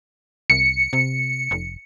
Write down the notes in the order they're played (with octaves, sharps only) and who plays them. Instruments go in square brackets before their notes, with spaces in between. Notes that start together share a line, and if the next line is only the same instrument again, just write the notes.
[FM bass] C2 [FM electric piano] C#7
[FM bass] C3
F1